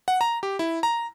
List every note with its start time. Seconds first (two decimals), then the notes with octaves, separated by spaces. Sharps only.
0.08 F#5
0.21 A#5
0.43 G4
0.59 E4
0.83 A#5